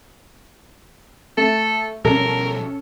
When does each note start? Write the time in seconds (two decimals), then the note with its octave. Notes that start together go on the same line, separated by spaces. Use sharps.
1.37 A3 A4
2.05 B2 F3 G3 C#4 A4 A#4